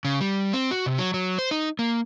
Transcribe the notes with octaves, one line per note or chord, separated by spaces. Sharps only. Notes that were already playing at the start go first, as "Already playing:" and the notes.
C#3
G3
C4
F#4
C3
F#3
F#3
C5
D#4
A#3